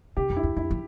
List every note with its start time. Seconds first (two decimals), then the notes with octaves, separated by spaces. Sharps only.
0.17 C3 G4
0.30 F2
0.36 E4
0.43 E2
0.57 F2 E4
0.71 F3